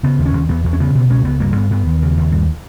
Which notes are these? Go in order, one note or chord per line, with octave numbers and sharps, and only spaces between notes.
C#3 B3
D#2
C#4
D#2
E2 B3
E2
C#4
C#3 B3
B2 B3
C#2 C#4
C#2 B3
G2 A#3
G2 B3
G2 B3
D#2
C#3
D#2
G2